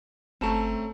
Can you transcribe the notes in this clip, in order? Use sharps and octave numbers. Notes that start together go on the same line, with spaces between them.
G1 A3 C4 C#4 A5 A#5